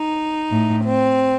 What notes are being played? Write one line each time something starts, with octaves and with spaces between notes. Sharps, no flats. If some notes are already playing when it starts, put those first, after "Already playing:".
Already playing: D#4
A2
C4